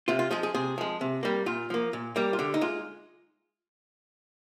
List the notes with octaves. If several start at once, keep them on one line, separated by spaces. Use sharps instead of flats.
C3 F4
F4
F3 G#3 G#4
G#4
C3 G#4
F3 G#3
C3
G3 A#3
A#2 F4
F3 A#3
A#2
G3 A#3
F4
D3 G4
D#4
G#3 F4